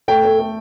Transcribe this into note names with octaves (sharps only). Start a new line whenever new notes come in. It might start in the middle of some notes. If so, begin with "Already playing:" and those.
A3 G5
A3
A3